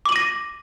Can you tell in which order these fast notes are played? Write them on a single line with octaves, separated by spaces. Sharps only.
D6 F#7 D#7 A#6